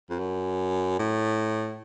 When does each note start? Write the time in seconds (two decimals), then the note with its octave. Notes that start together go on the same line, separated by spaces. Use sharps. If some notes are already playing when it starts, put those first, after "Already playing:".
0.10 F2
0.19 F#2
0.99 A2